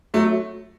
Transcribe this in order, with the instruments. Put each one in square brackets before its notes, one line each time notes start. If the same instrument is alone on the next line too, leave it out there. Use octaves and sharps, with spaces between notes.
[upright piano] F#3 A3